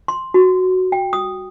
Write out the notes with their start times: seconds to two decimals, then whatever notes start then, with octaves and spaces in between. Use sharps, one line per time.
0.08 C6
0.34 F#4
0.92 G5
1.13 D#6